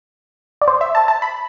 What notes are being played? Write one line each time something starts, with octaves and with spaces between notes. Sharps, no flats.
D5
C5
E5
A5
A5
B5